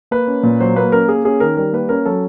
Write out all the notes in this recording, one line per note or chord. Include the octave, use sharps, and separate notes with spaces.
A#3 B4
C#4
A#2
F#3 C5
A#3 B4
C#4 A#4
A#3 G#4
C#4 G#4
D#3 A#4
G3 A#4
A#3 B4
C#4 A#4
F#3 A4